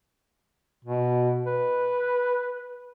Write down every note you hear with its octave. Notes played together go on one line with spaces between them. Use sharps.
B2
B4